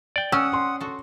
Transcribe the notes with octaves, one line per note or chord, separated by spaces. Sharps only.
D5 G5
C#4 F#5 D#6 E6
C6
F#4 A4